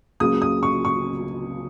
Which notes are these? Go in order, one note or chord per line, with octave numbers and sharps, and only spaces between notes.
C#2 C#3 F#3 A#3 D#6
D#6
C#6
C#6